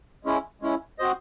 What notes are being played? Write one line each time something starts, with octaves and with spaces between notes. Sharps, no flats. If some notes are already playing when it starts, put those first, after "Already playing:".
G#3 C#4 E4
G#3 C#4 E4
C4 F#4 C5 D#5